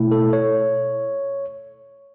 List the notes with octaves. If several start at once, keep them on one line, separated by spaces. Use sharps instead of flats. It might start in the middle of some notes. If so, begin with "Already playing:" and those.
Already playing: B2 A3 E4
A4
C#5